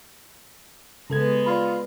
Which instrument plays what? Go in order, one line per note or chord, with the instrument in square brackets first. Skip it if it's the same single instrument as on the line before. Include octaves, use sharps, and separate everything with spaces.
[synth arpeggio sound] C#3 A4 G#6 [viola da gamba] G#3 B3
[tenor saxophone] F4 [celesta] D5 B5